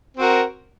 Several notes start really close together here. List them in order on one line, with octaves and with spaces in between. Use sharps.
C4 F#4 A#4